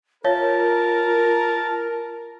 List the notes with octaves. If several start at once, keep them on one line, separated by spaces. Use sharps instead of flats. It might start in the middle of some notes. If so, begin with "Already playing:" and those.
F4 A#4 C#5 E5 F5 A5